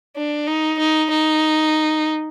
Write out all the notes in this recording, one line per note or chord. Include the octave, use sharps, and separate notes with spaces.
D4
D#4
D#4
D#4